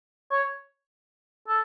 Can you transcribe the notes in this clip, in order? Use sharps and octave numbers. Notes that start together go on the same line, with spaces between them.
C#5
A4